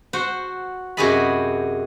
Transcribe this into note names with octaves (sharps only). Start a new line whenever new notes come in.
F#4 C5 F#5
F#2 C3 F#4 G#4 D#5 B5